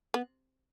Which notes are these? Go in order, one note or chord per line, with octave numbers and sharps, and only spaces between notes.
B3